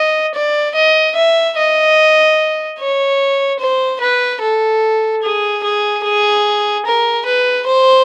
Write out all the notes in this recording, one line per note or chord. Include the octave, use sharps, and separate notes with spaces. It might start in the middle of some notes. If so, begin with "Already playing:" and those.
Already playing: D#5
D5
D#5
E5
D#5
C#5
C5
B4
A4
G#4
G#4
G#4
A#4
B4
C5